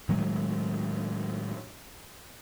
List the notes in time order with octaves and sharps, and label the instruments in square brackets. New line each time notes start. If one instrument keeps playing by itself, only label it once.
[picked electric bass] A2 D#3 F#3 G#3